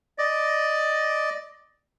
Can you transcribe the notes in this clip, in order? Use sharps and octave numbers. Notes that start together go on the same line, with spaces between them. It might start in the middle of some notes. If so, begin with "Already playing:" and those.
D5 D#5